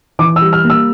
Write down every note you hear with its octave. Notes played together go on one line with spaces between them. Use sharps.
E3 D6
E6
G3
F6
A#3
E6